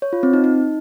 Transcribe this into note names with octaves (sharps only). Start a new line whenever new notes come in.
C#5
F4
C4
D#4
D#4